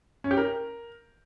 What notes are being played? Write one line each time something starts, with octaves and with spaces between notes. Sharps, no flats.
C#4
G4
A#4